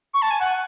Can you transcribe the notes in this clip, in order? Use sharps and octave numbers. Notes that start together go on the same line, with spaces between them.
C#6
A5
G#5
F#5